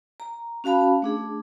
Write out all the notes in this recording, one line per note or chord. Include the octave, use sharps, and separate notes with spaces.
A#5
C#4 F#4 F5 A5 B5
A3 D4 G#4